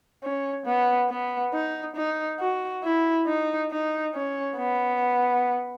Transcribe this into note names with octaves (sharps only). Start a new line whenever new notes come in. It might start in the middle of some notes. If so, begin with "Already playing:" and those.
C#4
B3
B3
D#4
D#4
F#4
E4
D#4
D#4
C#4
B3